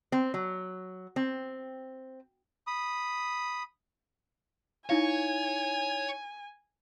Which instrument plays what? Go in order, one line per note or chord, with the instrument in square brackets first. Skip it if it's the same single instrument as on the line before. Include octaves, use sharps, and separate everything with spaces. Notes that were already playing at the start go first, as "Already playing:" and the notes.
[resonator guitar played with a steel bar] C4
F#3
C4
[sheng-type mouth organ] B5 D#6
[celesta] D#4 E4 F5 [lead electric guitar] C#5 [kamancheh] G#5